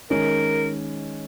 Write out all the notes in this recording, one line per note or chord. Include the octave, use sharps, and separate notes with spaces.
D#3 G#3 C#4 A#4